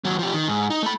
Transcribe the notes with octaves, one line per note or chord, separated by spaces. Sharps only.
D#2 F#3
F3 G4
D#3
G#2
D#4
A3 B5